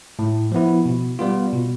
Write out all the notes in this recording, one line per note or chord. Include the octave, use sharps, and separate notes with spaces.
A2
F3 B3 E4
B2
G3 B3 F4
B2